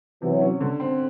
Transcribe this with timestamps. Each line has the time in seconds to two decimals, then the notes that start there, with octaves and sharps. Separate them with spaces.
0.22 C3 E3 F#3
0.41 C#4
0.61 D3
0.80 C4